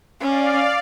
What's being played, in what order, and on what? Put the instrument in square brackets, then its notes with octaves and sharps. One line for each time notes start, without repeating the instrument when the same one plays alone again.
[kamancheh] C#4 [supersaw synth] D5 F5